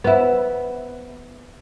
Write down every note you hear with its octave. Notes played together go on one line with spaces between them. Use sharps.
B3 E4